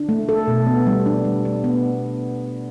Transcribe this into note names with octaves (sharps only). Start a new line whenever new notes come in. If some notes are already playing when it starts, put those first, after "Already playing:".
Already playing: D4
A3
A4
B2
B3
G3
D4
G3
D4
B3